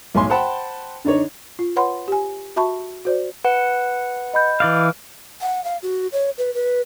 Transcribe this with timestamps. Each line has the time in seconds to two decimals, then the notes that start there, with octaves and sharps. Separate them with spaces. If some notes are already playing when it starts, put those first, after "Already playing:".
0.15 B1 A2 G#5 C6
0.30 C5 F#5 G5 A5 B5
1.04 D3 D4 D#4 C#5
1.59 F4
1.76 B4 C#5 F#5 B5 C6
2.08 G4 G#5
2.56 F#4 E5 A5 B5 C#6
3.05 F#4 C5 D5
3.45 B4 F#5
4.34 D#5 B5 G6
4.60 E3 D5 F5
5.41 F#5
5.64 F5
5.82 F#4
6.12 C#5
6.38 B4
6.54 B4